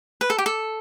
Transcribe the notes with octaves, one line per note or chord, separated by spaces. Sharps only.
B4
A4
G4
A4